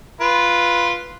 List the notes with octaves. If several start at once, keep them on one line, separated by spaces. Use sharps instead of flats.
F4 B4